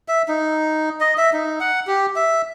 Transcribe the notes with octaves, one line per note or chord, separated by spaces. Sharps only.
E5
D#4
D#5
E5
D#4
F#5
G4
E5